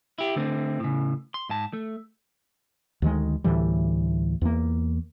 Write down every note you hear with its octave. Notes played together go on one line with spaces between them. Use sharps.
E4 G4
D3 A3 C4
A2 C#3
C6
G#2 A5
A3
D2 D#3 G#3
D2 A2 E3 G3
E2 A#3